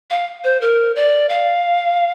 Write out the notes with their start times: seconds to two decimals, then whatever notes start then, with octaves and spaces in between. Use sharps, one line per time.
0.10 F5
0.44 C5
0.61 A#4
0.96 D5
1.29 F5